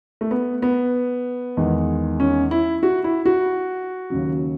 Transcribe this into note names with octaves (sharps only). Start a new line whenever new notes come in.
A3
B3
B3
E2 D#3 G#3
C#4
E4
F#4
E4
F#4
D#2 C#3 F#3